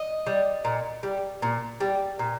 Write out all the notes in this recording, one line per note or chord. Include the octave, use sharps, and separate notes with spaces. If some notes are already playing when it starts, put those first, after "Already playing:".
Already playing: D#5
G3
A#2
G3
A#2
G3
A#2